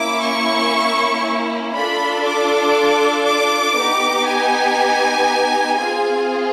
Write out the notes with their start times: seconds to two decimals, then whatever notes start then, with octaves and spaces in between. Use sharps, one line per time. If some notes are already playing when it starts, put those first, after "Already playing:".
Already playing: A#3 C#4 E4 D6
0.22 C#6
1.73 D4 F4 A4 B5
2.25 D6
3.24 D6
3.75 B3 D#4 G4
4.26 G#5
5.77 C4 F4 G#4 G#5